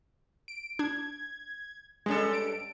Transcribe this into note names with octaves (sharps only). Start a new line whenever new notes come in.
D7
D4 G#6
G2 G#3 C#4 A4
D7